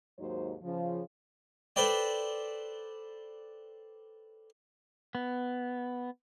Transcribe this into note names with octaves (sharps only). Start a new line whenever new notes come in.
D#2 G#2 F#3 D#4 C5
C#3 F3
A4 B4 C5 D5 G5
B3